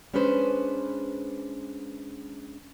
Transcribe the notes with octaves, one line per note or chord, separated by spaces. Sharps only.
G#3 C#4 D4 G#4 B4 C5